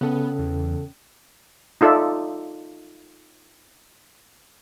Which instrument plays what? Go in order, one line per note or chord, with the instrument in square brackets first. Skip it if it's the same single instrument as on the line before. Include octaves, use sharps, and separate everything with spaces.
[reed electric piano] C#3 A4 [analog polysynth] B3 [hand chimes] C#4
[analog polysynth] E2
[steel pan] D#4 F4 A4 D5 E5